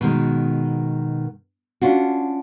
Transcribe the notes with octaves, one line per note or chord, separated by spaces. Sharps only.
B2 D#3 G#3
C#4 D4 F4 F#4